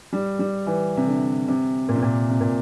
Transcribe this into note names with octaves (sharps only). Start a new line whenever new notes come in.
G3
G3
E3
C3
D3
C3
A#2
C3
A#2
C3
A#2